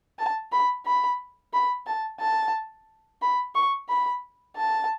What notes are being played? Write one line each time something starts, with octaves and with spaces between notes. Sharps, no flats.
A5
B5
B5
B5
A5
A5
B5
C#6
B5
A5